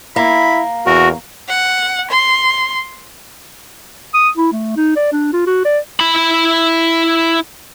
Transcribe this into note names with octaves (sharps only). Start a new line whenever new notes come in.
A#3 E4 B5
E2 F#4 A#4
F#5
C6
D#6
E4
A3
D#4
D5
D4
F4
F#4
D5
E4 B5